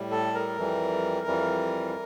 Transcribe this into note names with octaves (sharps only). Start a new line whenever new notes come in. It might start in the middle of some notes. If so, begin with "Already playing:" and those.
Already playing: A2 G3
A4
A#4
F2 E3 G3
F2 E3 G3